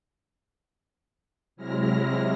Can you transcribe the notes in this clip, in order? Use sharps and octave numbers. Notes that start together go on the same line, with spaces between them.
C3 F#3 G#3 E4 F6 A#6